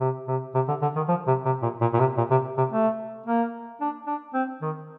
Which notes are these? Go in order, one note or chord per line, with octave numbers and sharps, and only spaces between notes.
C3
C3
C3
D3
D3
D#3
F3
C3
C3
A#2
A#2
A#2
C3
A#2
C3
C3
A3
A#3
D4
D4
C4
D#3